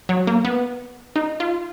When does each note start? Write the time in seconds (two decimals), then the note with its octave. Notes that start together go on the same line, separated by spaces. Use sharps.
0.09 F#3
0.27 A#3
0.45 B3
1.16 D#4
1.40 F4